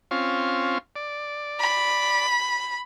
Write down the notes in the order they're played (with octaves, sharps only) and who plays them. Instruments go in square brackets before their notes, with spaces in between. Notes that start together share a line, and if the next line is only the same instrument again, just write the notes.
[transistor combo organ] C4 C#4 F4
D5
[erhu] B5